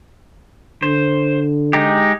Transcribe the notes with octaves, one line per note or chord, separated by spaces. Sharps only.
D3 C5
G#3 D#4 G4